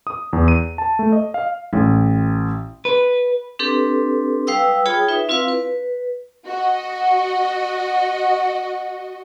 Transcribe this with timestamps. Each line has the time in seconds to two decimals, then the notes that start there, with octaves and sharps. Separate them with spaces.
0.07 D#6
0.33 E2
0.48 D#7
0.78 A5
0.99 A3
1.12 D#5
1.34 F5
1.73 A1
2.85 B4
3.59 C4 D4 G4 A4 B4
4.47 G3 B4 F5 G5 D#6 E6
4.86 F4 G#4 C#5 G5 B5 D#6
5.08 D#4 B4 E5
5.29 C4 E4 F4 B4 F5
5.48 B4
6.45 F#4 D#5